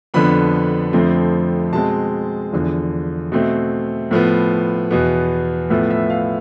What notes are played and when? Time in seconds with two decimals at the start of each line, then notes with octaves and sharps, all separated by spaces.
0.14 F2 D3 F3 B3 B5
0.93 F2 D3 F3 A3 C4
1.73 B2 G#3 C4 A5
2.52 E2 D3 F3
3.32 B2 A3 C4
4.11 A2 F3 B3
4.91 E2 B2 B3
5.70 A2 F3 B3 E5
5.90 E5
6.10 F5